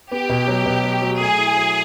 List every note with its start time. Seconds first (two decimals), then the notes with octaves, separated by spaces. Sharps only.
0.12 B3 G4
0.29 B2
0.47 F#3
0.66 B2
0.84 F#3
1.02 F#3
1.20 A3 G#4
1.38 E4
1.56 F#3